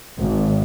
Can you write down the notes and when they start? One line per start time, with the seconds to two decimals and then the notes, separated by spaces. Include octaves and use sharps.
0.18 G#1